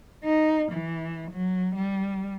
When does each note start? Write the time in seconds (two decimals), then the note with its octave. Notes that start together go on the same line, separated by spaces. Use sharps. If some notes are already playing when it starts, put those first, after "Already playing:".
0.24 D#4
0.72 E3
1.31 F#3
1.75 G3